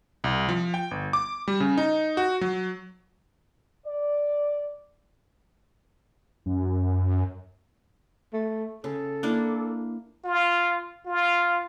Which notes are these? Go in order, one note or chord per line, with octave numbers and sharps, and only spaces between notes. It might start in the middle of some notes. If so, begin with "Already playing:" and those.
C2
F3
G5
G1
D6
G3
C#3
D#4
F#4
F#3
D5
F#2
A3
C#3 A4
A#3 D4 E4
F4
F4